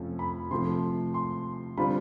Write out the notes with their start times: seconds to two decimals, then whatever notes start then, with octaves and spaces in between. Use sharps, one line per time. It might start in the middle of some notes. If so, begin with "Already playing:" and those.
Already playing: F2 C3 F3 A3 C#4
0.19 B5
0.51 C3 F3 A3 C6
1.14 C6
1.77 D3 G3 C4 F4 B5